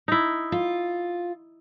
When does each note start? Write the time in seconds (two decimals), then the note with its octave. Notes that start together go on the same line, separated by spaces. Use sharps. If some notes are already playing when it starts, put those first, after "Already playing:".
0.08 D#4 E4
0.52 F4